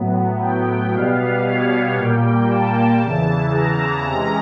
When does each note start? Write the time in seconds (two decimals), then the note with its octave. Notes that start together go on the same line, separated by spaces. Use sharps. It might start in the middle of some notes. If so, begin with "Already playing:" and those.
Already playing: A2 F#3 B3
0.41 G5
0.93 B2 G3 B3 F5
1.45 C#5
1.97 A#2 G3 A#3 G5
2.49 A5
3.01 E2 C#3 E3
3.53 A#5
4.06 C3 E3 G#3 C#4